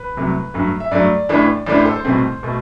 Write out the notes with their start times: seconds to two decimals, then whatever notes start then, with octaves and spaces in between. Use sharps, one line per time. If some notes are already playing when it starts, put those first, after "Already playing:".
Already playing: B4
0.17 C2 C3 F#3 A3
0.54 G2 F#3 A3
0.80 E5
0.91 G2 F#3 A3 D5
1.29 A1 A2 E3 A3 D4
1.66 A1 A2 E3 A3 D4 D5
1.76 C5
1.85 A4
1.96 C5
2.05 C2 B2 A3 C4
2.43 B2 A3